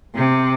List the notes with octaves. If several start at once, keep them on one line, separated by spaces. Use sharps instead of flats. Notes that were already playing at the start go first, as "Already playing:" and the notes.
C3